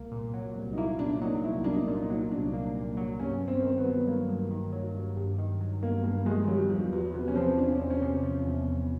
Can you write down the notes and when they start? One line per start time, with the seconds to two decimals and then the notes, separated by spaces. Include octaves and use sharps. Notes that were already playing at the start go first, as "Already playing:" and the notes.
Already playing: C2 A#3
0.12 A#2
0.34 F#3
0.56 C2
0.73 D#4
0.78 A#3 E4
0.99 A#2 D4
1.22 F#3 D#4
1.44 C2 E4
1.64 A#3 D4
1.73 D#4
1.88 A#2
2.02 D#4
2.10 F#3
2.31 C2 D4
2.54 A#3
2.75 A#2
2.97 F#3
3.19 G2 C#4
3.41 G2
3.48 C4
3.63 D#3
3.78 B3
3.85 F#3
4.07 G2 A#3
4.28 G2
4.51 D#3
4.72 F#3
4.94 G2
5.16 G2
5.38 D#3
5.60 F#3
5.83 G2 A#3
6.04 G2 A#3
6.26 D#3 G#3
6.48 F#3 G3
6.70 E2 F3
6.92 E2 F#3
7.14 C3 B3
7.28 C#4
7.36 F3 C4
7.58 E2 D4
7.68 C#4
7.80 E2 C4
7.90 C#4
8.02 C3
8.23 F3
8.45 E2
8.68 E2